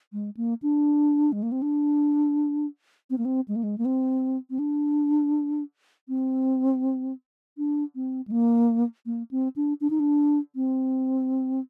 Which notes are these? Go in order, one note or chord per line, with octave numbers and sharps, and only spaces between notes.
G#3
A#3
D4
G#3
A#3
C4
D4
C4
A#3
C4
G#3
A#3
G#3
A#3
C4
C4
D4
C4
D4
C4
G#3
A#3
A#3
C4
D4
D4
D#4
D4
C4